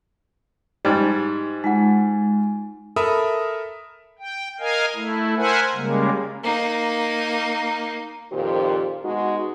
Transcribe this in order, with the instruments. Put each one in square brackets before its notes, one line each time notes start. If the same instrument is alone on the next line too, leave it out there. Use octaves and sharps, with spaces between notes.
[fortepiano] G#2 G3 [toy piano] D#4 E4 G#5
[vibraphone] G#3 [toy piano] D#4 F4 F#5
[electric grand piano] A4 A#4 E5 B5 D#6
[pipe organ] G5
A#4 D#5 F5 G#5
A3 E4
A#4 C5 E5 F#5 G#5
C#3 G3 G#3 A#3
[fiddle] A#3 D#4
[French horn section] F2 A#2 D#3 G4 C5
B2 G#3 D#4 F#4